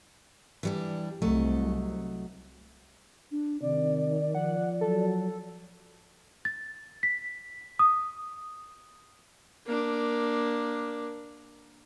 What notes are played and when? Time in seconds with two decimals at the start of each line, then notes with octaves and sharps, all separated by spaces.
0.63 E3 G3 D4
1.22 C2 F#3 A3 D#5
3.32 D4
3.62 C3 D#3 D5
4.35 F3 F#5
4.81 F#3 A4
6.45 A6
7.03 B6
7.79 D#6
9.66 A#3 D4